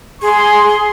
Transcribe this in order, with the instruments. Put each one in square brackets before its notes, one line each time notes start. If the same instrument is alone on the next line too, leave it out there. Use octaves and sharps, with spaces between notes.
[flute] G#4 [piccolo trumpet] C6